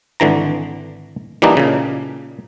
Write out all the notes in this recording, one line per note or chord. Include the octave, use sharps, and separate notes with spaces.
G#1 D3 E3 A#5
E3 G3 A#3 D4 D#4
A#2 C#3